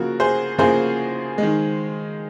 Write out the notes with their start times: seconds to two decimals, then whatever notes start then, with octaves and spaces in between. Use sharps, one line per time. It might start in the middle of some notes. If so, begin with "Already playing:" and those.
Already playing: C#3 F3 A#3 F#4 A#4
0.20 G#4 C5
0.58 C#3 F3 A#3 G#4 C5
1.38 D#3 G#3